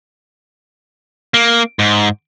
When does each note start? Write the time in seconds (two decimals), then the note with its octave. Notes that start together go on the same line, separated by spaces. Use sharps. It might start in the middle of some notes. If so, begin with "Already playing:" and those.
1.34 A#3
1.79 G#2